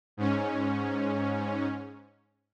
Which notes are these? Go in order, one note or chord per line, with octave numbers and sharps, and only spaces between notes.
G#2 C#4